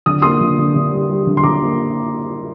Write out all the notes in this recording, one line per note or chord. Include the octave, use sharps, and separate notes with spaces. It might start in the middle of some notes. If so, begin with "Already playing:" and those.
D3 D#6
A#3 C6 D#6
D3
D3
D3
G3
G3
D3
C6
D3 A#5 D6
A#3